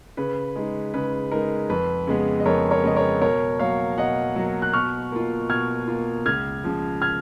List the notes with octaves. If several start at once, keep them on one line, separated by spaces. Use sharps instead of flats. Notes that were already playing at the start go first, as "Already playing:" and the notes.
C#3 B4
G#3 D#4
C#3 B4
G#3 D#4 A#4
F2 B4
C#3 G#3 B3
D#5
F2 A#4 C#5
A#4 C#5
C#3 G#3 B3 D#5
A#4 C#5
B2 A#4 C#5
F#3 A#3 C#5 F5
B2 D#5 F#5
F#3 A#3
F#6
B2 C#6 F6
A#3 F4
B2 F6 G#6
A#3 F4
C#2 F6 G#6
C#3 F3
F6 G#6